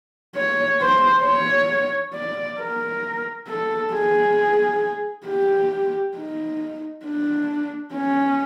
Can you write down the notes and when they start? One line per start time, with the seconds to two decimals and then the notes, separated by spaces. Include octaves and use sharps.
0.35 C#5
0.81 C5
1.25 C#5
2.14 D5
2.60 A#4
3.48 A4
3.94 G#4
5.27 G4
6.16 D#4
7.05 D4
7.95 C#4